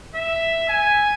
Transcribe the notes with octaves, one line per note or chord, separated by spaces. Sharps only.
E5
G#5